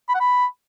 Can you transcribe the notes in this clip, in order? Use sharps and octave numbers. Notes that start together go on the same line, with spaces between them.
B5
F#5
B5